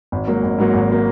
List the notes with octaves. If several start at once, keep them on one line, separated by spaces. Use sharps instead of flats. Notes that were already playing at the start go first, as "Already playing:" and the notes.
G#1
G#2 F#3 A#3
G#1
G#2 F#3 A#3
G#1
F#3 A#3